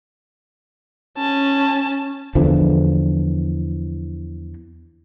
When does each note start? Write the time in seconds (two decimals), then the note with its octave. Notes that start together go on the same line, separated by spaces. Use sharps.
1.18 C#4 A5
2.35 E2 D3 E3 F3